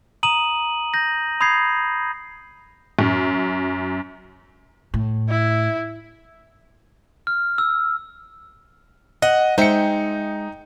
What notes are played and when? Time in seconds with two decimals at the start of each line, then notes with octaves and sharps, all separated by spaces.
0.23 A#5 D#6 D#7 F#7
0.94 G6 A#6
1.41 B5 D#6 G6 G#6 C7
2.99 F#2
4.94 A2
5.29 E4
7.27 F6
7.58 E6
9.22 D#5 F#5
9.58 G#3 D#4 C5 E5 G5 C#7